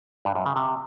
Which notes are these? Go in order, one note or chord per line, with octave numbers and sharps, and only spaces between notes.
G2
F#2
C#3
C3